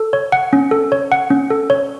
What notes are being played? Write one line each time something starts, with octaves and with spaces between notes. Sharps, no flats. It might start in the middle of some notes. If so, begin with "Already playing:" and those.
Already playing: A4
C#5
F#5
C#4
A4
C#5
F#5
C#4
A4
C#5